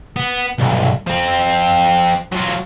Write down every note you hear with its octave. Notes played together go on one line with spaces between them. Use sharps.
B3
B1 G2
F3 C4
F#3 F4